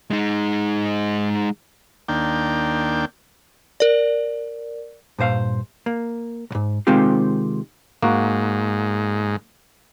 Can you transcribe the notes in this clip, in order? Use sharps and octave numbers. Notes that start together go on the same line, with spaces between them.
G#3 D#4
D#2 A#3 D4 G5
A#4 D5
G2 A#2 C5 F5
A#3
B1 G#2
C3 D#3 G#3 C4 F4 G4
G#2 A#3 F#4